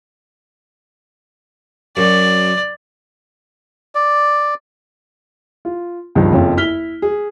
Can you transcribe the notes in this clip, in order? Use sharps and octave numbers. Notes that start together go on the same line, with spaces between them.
F#2 D5
D5
F4
C#2 G2 D#3 F3
F#1 F2 C#4 F4
E4 F6 B6 G7
G#4